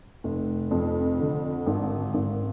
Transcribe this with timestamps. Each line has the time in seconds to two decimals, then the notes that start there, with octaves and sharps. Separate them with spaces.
0.24 F1
0.71 F2
1.19 D3
1.66 G#1
2.14 G#1